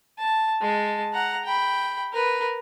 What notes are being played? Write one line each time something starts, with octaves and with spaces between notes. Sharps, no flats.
A5
G#3 A5
F#5 A#5
G5 B5
A#4 B4